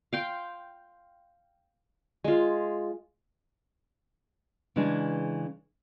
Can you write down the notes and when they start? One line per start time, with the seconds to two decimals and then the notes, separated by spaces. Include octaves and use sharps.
0.13 F5 G5 C6
2.24 G#3 F4
4.76 C#3 E3 G#3 D4 G#4